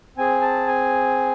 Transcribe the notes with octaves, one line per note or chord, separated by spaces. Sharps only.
C4 G#4 G#5
A5
G#5